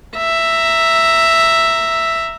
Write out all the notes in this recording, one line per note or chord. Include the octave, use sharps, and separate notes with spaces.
E5 A#5